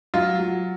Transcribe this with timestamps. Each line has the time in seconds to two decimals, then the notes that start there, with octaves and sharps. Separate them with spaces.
0.14 F#3 F4
0.39 F#3